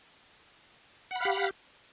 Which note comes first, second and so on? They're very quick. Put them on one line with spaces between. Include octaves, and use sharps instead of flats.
F#5 B5 F5 G4